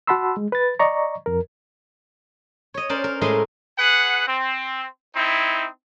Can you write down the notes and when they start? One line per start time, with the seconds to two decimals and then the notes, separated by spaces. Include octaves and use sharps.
0.07 F#4 F#5 A5 B5 C6 E6
0.37 G#3
0.52 B4 A6
0.79 D5 D#5 A#5 C#6
1.26 F2 A#4
2.74 C#5 D#5
2.89 C#4 A#4 C5 D5
3.04 A#4
3.21 A2 G#3 A3 A#4 D#5 C6
3.78 G#4 B4 F#5
4.27 C4
5.15 C4 D#4 E4